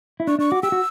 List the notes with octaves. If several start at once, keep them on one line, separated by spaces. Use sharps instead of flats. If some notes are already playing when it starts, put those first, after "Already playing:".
E4
D4 C#6
D4 C#6
F#4 D6
G4 E6
F#4